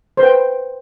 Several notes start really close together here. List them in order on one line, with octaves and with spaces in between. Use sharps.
C5 B4 G5